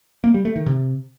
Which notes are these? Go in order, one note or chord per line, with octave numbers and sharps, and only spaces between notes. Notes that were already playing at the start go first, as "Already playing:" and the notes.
A#3
G3
A3
D#3
C3